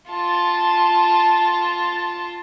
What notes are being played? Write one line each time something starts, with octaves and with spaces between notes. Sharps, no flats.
F4 A5